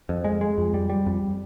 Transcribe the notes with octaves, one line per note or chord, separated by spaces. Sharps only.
F2
G#3
G#3
F2
G3
G3
F2